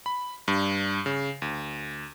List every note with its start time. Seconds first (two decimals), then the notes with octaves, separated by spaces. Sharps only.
0.06 B5
0.48 G2
1.06 C#3
1.42 D2